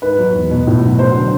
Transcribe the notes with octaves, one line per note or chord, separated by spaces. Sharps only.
G#2 B4
F#3
E2
B2
A2
F#3
F#3 C5
D3